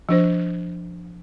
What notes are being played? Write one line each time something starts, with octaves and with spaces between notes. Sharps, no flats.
F3 D4 C5